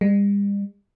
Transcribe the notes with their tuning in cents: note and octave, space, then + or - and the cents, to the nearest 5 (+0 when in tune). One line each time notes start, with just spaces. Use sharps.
G3 +45